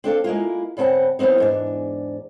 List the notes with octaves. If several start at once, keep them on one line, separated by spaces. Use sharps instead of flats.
C4 D4 A4 F5
G#3 A#3 E4 F4
G2 C#3 C4 F#5 A5
E3 F#3 B3 C4 D#4
E2 G#2 D4